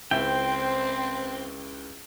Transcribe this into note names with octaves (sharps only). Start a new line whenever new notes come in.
C#2 C4 E4 C5 E5 G5